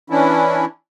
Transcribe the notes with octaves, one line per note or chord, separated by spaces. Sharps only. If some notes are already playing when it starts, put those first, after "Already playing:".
E3 C#4 D4 E4